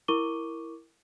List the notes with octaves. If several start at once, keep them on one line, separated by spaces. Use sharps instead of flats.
E4 A#4 C#6 D6 D#7 G7